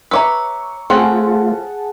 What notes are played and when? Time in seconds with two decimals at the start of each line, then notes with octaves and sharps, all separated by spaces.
0.11 B4 C#5 E5 A#5 C#6 D6 E6
0.90 A3 C4 C#4 F4 G#4 F#5 A5